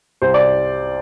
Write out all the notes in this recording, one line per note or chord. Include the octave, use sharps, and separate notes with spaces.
C2 C5
D5